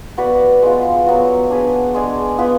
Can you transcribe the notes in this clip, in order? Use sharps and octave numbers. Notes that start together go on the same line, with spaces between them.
B3 F#4 B4 D5
G#3 B3 F4
F#3 B3 F#4
D4 G#4 B4
G#3 D4 G#4 D5
B3 F4 B4